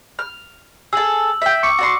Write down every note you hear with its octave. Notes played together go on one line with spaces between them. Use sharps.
F6
G#4 A4 E6 F#7
E5 G5
C#6 D6 C#7
F#4 D5 C6